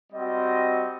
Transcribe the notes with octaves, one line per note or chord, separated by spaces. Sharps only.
G3 C4 F#4 D#5